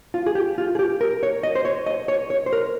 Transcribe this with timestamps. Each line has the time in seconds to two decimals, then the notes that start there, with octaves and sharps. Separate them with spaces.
0.14 F4
0.26 G#4
0.35 G4
0.58 F4
0.75 G#4
0.79 G4
1.01 A#4
1.23 C#5
1.43 D#5
1.55 C5
1.65 C#5
1.86 D#5
2.08 C#5
2.30 C#5
2.46 C5
2.53 A#4